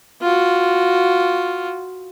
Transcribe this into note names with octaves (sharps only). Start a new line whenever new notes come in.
F4 F#4